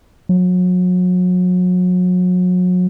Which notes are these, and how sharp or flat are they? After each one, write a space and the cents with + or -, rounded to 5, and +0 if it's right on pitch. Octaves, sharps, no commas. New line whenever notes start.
F#3 -35